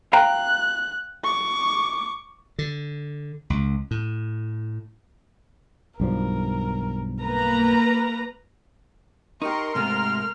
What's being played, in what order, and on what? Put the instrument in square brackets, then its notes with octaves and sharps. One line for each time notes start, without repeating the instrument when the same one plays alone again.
[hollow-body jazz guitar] F5 G5 A#5 [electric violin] F#6
[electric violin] C#6 D6
[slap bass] D3
C#2
A2
[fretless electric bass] B1 G2 F3 [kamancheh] A#4
[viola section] A#3 B4 A#5 [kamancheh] A#4
[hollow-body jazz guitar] D#4 G4 [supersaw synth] A#4 C6 [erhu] C#6
[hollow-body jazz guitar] G#2 C3 A3 [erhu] F6